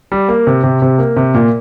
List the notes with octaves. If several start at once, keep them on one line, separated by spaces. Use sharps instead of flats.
G3
A#3
C3
C3
C3
A#3
C3
A#2